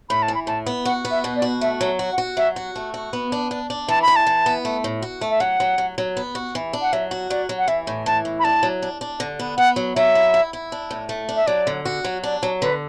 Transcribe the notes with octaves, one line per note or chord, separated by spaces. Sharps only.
A2 B5
A5
E3
B5
A2 A5
B3
F#4 F#5
B3
E5
B2
D5
F#4
A3 E5
F#3
F#4
F#5
F#4
F#3 E5
F#4
A3
F#4
B3
D4
D4
D4
E3 A5
B5
E3
A5
E3
B3
A3
A2
F#4
A3
E5
F#3 F#5
F#3
F#3
F#3
B3
F#4
E3
D4
F#5
F#3 E5
F#4
F#3 D5
F#3
F#5
E3 E5
A2
E3 A5
A2
B5
D4 A5
F#3
D4
D4
D3
B3
B3 F#5
F#3
F#3 E5
E4
E4
E4
D4
A2
A3
D4
E5
F#3 D5
D3
F#4
F#3
D4 D5
F#3
D3 B4